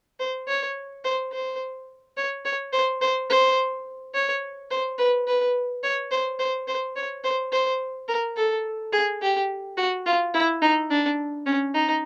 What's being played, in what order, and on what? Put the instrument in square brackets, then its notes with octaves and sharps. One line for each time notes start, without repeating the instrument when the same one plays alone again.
[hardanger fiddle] C5
C#5
C5
C5
C#5
C#5
C5
C5
C5
C#5
C5
B4
B4
C#5
C5
C5
C5
C#5
C5
C5
A#4
A4
G#4
G4
F#4
F4
E4
D#4
D4
C#4
D#4